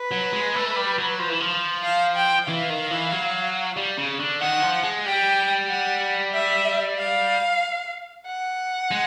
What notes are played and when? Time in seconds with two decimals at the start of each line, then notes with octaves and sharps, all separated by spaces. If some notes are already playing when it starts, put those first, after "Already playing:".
Already playing: B4
0.11 F#3
0.33 G#3
0.55 A3
0.76 G3
0.98 F#3
1.19 F3
1.30 E3
1.41 F3
1.84 F5
2.16 G5
2.47 E3 F5
2.70 D#3
2.91 E3
3.12 F#3
3.77 G3
3.98 C#3
4.19 D3
4.41 D#3 F#5
4.62 F3
4.83 G#3
5.05 G3 G5
5.70 F#5
6.34 E5
6.98 F5
8.26 F#5
8.91 G#3